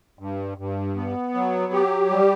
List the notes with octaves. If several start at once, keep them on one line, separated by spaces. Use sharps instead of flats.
G2
G2
B3
F#3
G4
G3